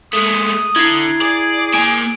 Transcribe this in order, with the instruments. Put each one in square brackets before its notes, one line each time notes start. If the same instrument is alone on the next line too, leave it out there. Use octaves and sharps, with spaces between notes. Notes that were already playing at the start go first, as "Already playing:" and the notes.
[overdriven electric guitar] G#3 A3 [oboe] D#6
[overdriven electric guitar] D3 [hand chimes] E4 C7 [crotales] G#6
[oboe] G#4 [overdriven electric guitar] D5
[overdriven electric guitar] A#3 G#5 [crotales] D7